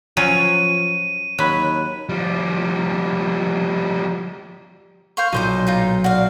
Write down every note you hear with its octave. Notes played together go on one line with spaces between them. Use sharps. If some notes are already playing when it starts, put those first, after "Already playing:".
F3 F#3 C#4 F4 D#7
D#2 F#3 B5 F#6
F3 G3
C5 F5 C#6
B1 A#2 D#4 C5 D6
D#4 F4 A#5
F#4 D5 F5